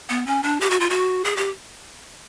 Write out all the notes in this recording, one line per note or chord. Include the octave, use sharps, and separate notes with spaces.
B3
C#4
D4
G4
F#4
F4
F#4
G#4
G4